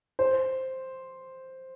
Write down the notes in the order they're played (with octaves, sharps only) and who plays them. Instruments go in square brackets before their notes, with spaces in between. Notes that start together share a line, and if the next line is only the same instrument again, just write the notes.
[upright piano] C5